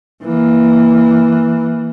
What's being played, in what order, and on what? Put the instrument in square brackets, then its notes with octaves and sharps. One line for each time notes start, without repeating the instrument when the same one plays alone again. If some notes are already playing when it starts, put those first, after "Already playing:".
[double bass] E3 A#3